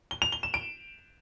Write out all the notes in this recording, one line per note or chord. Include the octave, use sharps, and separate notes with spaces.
G7
F7
G7
E7
D7